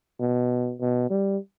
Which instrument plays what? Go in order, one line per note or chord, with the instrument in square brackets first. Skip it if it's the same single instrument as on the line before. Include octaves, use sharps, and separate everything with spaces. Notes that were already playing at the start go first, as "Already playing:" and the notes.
[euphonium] B2
B2
G3